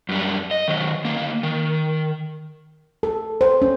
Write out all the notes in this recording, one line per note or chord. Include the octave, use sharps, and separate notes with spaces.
F#2 G3
D#5
D#3 F#3
D2 A#3
D#3
A4
C5
C#4